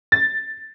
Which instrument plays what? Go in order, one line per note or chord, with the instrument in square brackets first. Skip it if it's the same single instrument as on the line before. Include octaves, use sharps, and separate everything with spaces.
[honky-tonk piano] A6